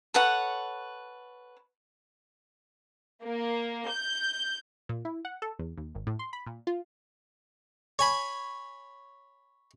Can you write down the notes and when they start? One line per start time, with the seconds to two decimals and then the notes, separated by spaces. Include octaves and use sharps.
0.14 A4 B4 C#5 F#5
3.24 A#3
3.88 G6
4.89 A#2
5.05 E4
5.25 F#5
5.42 A4
5.59 E2
5.77 D#2
5.95 G#1
6.07 A2
6.19 C6
6.33 B5
6.46 A#2
6.67 F4
7.99 C#5 G#5 B5